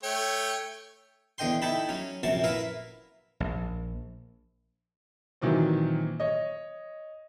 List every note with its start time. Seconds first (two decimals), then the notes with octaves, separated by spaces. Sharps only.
0.03 A3 C#5 G5
1.38 E2 D3 D#5 G5 C6
1.62 D#4 E4 A4 G5 A5 B5
1.89 F#3 C#4
2.23 A#1 F#2 C3 F#4 A5 C#6
2.44 E4 A#4 B4 E5 F5
3.40 A#1
5.41 A#2 D#3 E3 F#3 C4
6.20 C#5 D#5